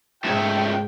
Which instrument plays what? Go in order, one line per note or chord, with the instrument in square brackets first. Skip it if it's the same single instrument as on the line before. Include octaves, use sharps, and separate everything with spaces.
[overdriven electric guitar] C#2 A3 [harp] G#2 G#6 E7 [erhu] G5